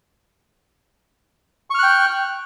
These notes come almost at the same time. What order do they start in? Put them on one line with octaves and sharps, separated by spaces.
C#6 F6 F#6 G5